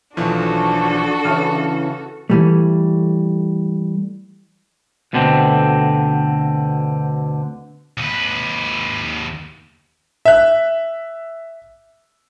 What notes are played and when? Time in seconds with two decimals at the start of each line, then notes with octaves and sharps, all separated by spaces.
0.17 B1 E3 F3 D4 F#4 A4
1.25 C#3 E3 F6
2.30 E3 G3 A3
5.13 D2 B2 D3 C4
7.98 D#2 B4
10.25 E5 F#6